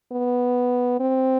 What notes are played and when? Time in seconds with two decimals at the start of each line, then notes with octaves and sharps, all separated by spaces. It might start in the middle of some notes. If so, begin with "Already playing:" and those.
0.12 B3
1.00 C4